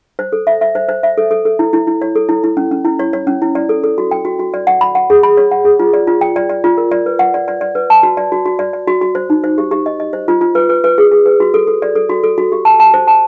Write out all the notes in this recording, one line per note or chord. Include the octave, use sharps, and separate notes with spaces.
C5
A4
E5
E5
C5
C5
E5
A4
A4
A4
E4
E4
E4
C#5
A4
E4
E4
C#4
C#4
E4
C#5
C#5
C#4
E4
D5
A4
A4
F#4
G5
F#4
F#4
D5
F#5
B5
F#5
G#4
B5
C#5
F#5
G#4
F4
D5
F4
G5
D5
D5
F4
A#4
D5
B4
F#5
D5
D5
D5
B4
A5
F#4
D5
F#4
F#4
D5
D5
F#4
F#4
C5
D#4
C5
G4
G4
D#5
D#5
C5
F4
F4
B4
B4
B4
G#4
G#4
B4
F#4
A4
A4
D5
A4
F#4
A4
F#4
G4
A5
A5
C5
A5